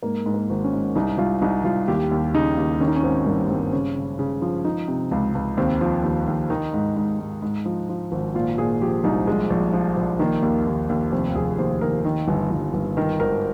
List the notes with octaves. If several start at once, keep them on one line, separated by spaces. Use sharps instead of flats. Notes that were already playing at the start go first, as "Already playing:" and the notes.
G#2 A#3
G#2
A#3
G#1
C#4
G#2
C2 D#4
C2 F4
C2 D#4
C2 F4
D#2 G4
D#2
C#3 D#4
D#2
D#3 C#4
D#4
C#4
G#1 C4
G2 A#3
G2 C4
C#3 C#4
C#3
C#3
F3
F3 D#4
C3
C#2
C#2
D#2 C4
F3
D#2
D#2
D#3 D#4
G#2
G#2
G#2
G#2
F3
F3
G#1
A#2 F4
A#2 G#4
F3 G4
C2 D#4
A#1 G#3
A#1
F3
A#1
D#3 A#3
D#2
D#2
D#2
F1 C4
F1 G#4
D#2 C5
D#2 A#4
D#3 A#4
G1
G1
G1
D#3 A#4
G#1 A#4